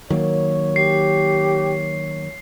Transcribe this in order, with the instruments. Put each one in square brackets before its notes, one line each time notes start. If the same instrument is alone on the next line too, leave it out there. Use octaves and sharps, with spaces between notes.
[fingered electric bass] D#3 F#3 A#3 [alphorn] C#5
[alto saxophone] G4 [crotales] C7